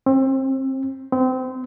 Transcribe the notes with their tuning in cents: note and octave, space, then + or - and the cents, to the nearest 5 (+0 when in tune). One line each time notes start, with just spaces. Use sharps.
C4 +30
C4 -25